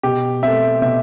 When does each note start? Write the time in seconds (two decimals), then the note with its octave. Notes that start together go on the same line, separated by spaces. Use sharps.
0.03 B2 G4
0.43 A3 C4 E5
0.82 B2 E5